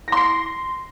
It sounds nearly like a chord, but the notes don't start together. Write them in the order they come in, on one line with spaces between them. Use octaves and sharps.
A#6 C6 C7